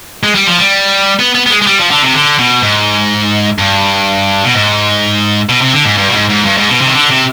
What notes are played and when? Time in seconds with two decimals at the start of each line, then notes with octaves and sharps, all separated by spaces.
0.23 G#3
0.35 G3
0.47 F3
0.59 G3
1.19 B3
1.35 B3
1.46 B3
1.51 G#3
1.62 G#3
1.67 G3
1.78 F3
1.91 D3
2.03 C3
2.14 D3
2.39 B2
2.62 G#2
3.58 G2
4.44 B2
4.54 G#2
5.49 B2
5.61 C3
5.73 D3
5.85 G#2
5.97 G2
6.08 B2
6.13 G#2
6.29 G#2
6.45 G2
6.57 G#2
6.69 B2
6.81 C3
6.87 D#3
6.93 D3
7.09 C3